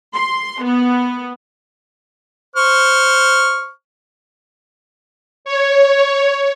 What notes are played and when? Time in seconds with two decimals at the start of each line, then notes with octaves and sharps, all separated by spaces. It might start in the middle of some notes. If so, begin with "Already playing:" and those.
0.16 C6
0.64 B3
2.56 C5 C#6 F6
5.45 C#5